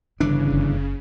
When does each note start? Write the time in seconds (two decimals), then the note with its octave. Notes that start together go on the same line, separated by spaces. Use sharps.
0.20 G1 C#3 E3 D4 E4
0.51 F#1